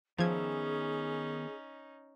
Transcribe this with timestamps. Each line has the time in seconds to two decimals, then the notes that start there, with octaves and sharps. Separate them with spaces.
0.18 D#3 F3 B3 C#4 D#4 G#4 E5 G#6